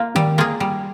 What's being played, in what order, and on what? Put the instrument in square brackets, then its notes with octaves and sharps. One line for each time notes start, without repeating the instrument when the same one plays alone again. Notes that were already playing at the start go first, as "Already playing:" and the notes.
Already playing: [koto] A#3 F4
[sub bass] D#3 [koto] G3
[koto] A#3 F4 G#4
G3